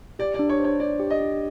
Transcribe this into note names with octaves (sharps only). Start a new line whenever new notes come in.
G4 D5
D4 D5
C#5
C5 C#5
D4 D5
G4
D#5
D4